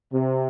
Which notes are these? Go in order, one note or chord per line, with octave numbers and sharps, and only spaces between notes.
C3